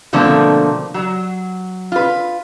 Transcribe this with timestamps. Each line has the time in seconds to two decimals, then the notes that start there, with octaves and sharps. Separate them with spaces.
0.13 B2 D3 F3 A3 A#3 C4
0.94 F#3
1.92 F4 B4